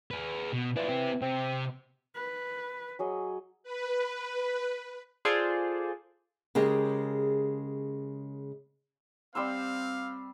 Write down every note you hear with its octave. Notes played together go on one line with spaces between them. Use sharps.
G#4 B4
B2
E3 D4 F4
C4 G4
C3 C4
B4
F#3 G#4 D#5
B4
F4 G#4 A4 C5 D5
C#3 G#3 G4 A#4
G3 C4 F5 C6 E6